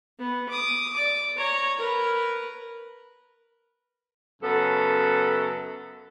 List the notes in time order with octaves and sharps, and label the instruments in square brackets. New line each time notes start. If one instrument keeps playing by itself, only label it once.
[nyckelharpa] B3
D6 D#6
D5 D6
C#5 A#5
A#4 B4
[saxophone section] F#2 C#3 B3 A4